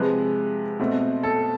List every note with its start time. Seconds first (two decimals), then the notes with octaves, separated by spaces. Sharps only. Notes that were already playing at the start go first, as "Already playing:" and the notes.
Already playing: C3 F3 G#3 B4
0.79 B2 A3 C4
1.23 A4